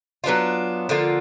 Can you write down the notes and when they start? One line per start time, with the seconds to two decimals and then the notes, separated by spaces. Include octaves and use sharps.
0.24 F#3 B3 D4 F4
0.89 D3 F3 A#3 F4